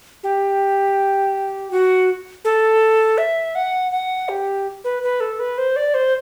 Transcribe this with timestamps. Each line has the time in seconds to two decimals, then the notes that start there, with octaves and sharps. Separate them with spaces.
0.23 G4
1.71 F#4
2.45 A4
3.18 E5
3.55 F#5
3.92 F#5
4.29 G4
4.84 B4
5.03 B4
5.20 A4
5.39 B4
5.58 C5
5.76 D5
5.94 C5